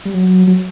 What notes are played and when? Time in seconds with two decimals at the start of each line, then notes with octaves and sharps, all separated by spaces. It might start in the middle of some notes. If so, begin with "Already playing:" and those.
0.05 G3
0.14 F#3
0.47 F#3